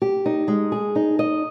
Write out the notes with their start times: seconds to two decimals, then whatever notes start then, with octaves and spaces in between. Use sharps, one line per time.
0.02 G4
0.26 D#4
0.48 G#3
0.72 G#4
0.96 D#4
1.19 D#5